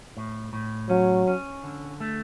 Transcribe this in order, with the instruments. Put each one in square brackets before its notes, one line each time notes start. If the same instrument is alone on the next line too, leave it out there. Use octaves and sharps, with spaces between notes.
[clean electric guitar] A2
A2
[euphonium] F#3 [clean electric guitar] C#4
[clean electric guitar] C#4
D3
A3